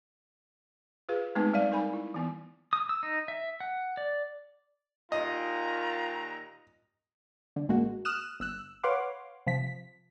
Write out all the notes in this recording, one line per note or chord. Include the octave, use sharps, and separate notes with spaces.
F4 G#4 B4 F5
G#3 A3 B3 C4 D#4 B4
G3 D5 F5
D#4 A#4 G#5 B5
E4
E3 B3
D#6
E6
D#4
E5
F#5
D5
D#2 A#2 F4 D#5 A#5
D3
A1 G#3 A#3 F#4
D#6 F6 F#6 E7
G1 E6 F#6
B4 C#5 F5 F#5 C6 D6
C3 F3 B6